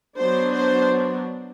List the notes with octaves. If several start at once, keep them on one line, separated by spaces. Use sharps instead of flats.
F#3 B3 D4 C5
C5